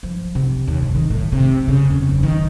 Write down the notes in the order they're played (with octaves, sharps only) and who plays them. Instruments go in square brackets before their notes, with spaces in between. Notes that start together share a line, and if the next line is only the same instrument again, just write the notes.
[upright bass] F3
C3
D#2
G2
D#3
A2
C3
C#3
E2
F#1
D#3